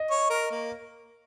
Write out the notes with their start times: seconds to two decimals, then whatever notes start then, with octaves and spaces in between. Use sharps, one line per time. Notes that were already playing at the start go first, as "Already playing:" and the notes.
Already playing: D#5
0.10 C#5
0.30 A#4
0.51 A#3